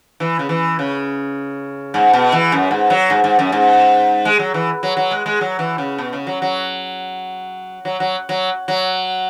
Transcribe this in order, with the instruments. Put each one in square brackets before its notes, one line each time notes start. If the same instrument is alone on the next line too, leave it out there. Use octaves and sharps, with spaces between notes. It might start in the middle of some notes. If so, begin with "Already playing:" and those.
[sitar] E3
C#3
E3
C#3
G#2
B2
E3
F#2
G#2
F#3
G#2
G#2
F#2
G#2
G#3
F#3
E3
F#3
F#3
G#3
G#3
F#3
E3
C#3
B2
C#3
F#3
F#3
F#3
F#3
F#3
F#3